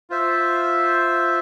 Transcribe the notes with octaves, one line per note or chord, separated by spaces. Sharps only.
F4 C5 E5